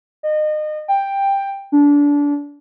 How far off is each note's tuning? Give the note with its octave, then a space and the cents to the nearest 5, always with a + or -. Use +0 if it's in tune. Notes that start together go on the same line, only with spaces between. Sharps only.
D#5 -30
G5 +10
D4 -25